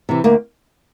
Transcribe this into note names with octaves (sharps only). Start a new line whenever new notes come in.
C3 E3
D2 A#3